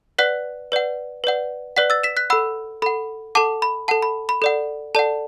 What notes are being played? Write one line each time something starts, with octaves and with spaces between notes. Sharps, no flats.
B4 D5 F#5 F#6 B6
B4 D5 F#5
B4 D5 F#5
B4 D5 F#5 F#6 B6
E6 A6
B6 E7
F#6 B6
A4 F#5 B5 E6
A4 F#5 B5
A4 F#5 A5 D6
B5
A4 F#5 A5
B5
B5
A4 D5 F#5
A4 D5 F#5 A5